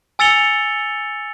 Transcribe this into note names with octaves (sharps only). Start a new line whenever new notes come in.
G#5 E6 A6 C#7 F7 G7